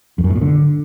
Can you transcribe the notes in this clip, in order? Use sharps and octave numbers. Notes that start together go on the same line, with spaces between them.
F2
F#2
A2
A#2
D3